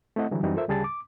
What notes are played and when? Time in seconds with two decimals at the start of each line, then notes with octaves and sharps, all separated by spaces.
0.16 A3 C4 E4 D#5 F#5
0.31 D3 E3 F#3 G3
0.43 F#2 E3 G3 C4 D#4 F#4
0.56 F4 A4 A#4 C5 E5
0.68 D2 C#3 G3 G#4 A5 A6
0.84 D6